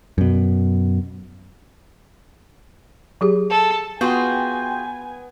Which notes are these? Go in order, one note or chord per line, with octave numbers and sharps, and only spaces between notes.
F#2 B2
F#3 G4 G#4
A4
B3 F4 F#4 G#4 G5 G#5 C6 G6